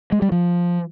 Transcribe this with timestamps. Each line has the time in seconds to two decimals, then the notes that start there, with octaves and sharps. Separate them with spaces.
0.12 G#3
0.22 G3
0.32 F3